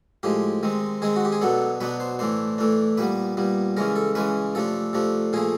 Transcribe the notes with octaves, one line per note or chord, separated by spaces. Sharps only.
A2 F3 G#3 G4
D#3 G#3 C4
D#3 G#3 C4 G#4
F#4
G4
G#4
B2 F#3 B3 D4 A4
B2 F#3 B3 D4 B4
C5
A2 E3 A3 D4 C5
A2 E3 A3 D4
A#2 G3 B3 B4
A#2 G3 B3
C#3 E3 G#3 C#4 A#4
A4
C#3 E3 G#3 C#4 B4
C3 F3 A3 D4 A4
C3 F3 A3 D4
A#2 F3 A3 G#4